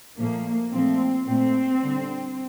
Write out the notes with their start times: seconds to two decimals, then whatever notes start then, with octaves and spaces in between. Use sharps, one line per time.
0.18 A#2 F3 A3 A#3
0.72 A#2 F3 A3 C4
1.27 A#2 A3 C4
1.81 D3 G3